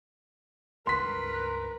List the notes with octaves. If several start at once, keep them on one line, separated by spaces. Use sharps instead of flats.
C#2 G2 A#4 B4 C6 B6